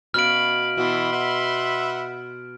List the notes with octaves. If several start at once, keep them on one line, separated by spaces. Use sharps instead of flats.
B2 C#4 E5 F5 B5 F6 D7
B2 E3 E5 F#5 B5 C6
B4 E5 F#5